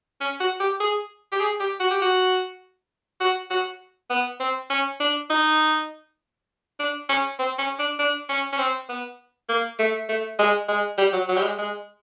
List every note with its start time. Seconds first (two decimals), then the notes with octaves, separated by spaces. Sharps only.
0.20 C#4
0.40 F#4
0.60 G4
0.80 G#4
1.32 G4
1.40 G#4
1.60 G4
1.80 F#4
1.91 G4
2.02 F#4
3.20 F#4
3.50 F#4
4.10 B3
4.40 C4
4.70 C#4
5.00 D4
5.30 D#4
6.79 D4
7.09 C#4
7.39 C4
7.58 C#4
7.79 D4
7.99 D4
8.29 C#4
8.52 C#4
8.58 C4
8.89 B3
9.49 A#3
9.79 A3
10.09 A3
10.39 G#3
10.68 G#3
10.97 G3
11.13 F#3
11.28 F#3
11.37 G3
11.43 G#3
11.58 G#3